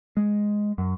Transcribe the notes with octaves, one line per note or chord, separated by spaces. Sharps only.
G#3
F#2